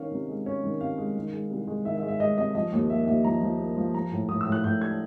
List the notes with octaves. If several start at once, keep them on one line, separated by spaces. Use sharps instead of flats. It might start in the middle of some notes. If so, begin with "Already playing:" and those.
Already playing: D#3 C#4 F5
C3
G#3
C#4
D#3
C3 F5
G#3
D#3
G#3
C2
G#3
D#3 E5
E5
G#3
E5
G#3 D#5
C3 D#5
F3 D#5
D#2
A#3 E5
D#2 E5
F3 A#5
F3
A#3
F3
F3 A#5
A2
A2 D#6
E6
A2
F#6
A2 G6
D4 G#6